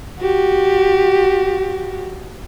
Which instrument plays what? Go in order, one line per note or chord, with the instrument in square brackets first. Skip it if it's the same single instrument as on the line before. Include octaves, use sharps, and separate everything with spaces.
[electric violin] F#4 G4